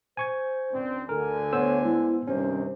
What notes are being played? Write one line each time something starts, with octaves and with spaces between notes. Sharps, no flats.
C5 G#5 C#6 G#6
C#2 C4 D4
D2 D3 A4 A#4 G#5
B3 C5 C#5 E6
G#3 E4
G2 C3 D#3 C#4 C5